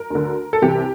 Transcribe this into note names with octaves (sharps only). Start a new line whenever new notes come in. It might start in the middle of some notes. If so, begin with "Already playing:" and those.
Already playing: A#4
D2 D3
A4
C2 C3 E3 G4